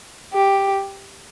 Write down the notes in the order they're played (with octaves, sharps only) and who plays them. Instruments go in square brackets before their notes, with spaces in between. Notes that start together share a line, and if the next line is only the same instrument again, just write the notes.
[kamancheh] G4